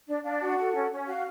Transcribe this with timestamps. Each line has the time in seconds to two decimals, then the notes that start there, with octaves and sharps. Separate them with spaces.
0.08 D4 D5
0.24 D4 F5
0.41 F#4 F#5
0.58 A4
0.74 C#4
0.91 C#4
1.06 F#4 F5